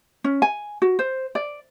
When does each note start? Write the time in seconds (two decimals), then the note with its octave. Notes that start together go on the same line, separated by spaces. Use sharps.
0.24 C#4
0.42 G#5
0.82 F#4
0.99 C5
1.35 D5